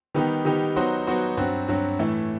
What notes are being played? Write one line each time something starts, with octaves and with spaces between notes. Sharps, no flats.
D#3 G3 B3 D#4 G4
D#3 G3 B3 D#4 G4
F#3 B3 D#4 F#4 C5
F#3 B3 D#4 F#4 C5
G2 F#3 C4 F#4
G2 F#3 C4 F#4
A2 E3 A3 E4